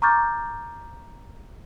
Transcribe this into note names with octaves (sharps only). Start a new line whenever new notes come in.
A#5 C#6 D6 F6 G6 A6